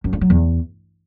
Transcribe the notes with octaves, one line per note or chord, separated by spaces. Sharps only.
F#2
G2
F#3
E2